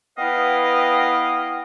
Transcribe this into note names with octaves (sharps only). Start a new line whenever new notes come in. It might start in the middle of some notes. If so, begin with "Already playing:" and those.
B3 E4 B4 D#5 F5 G5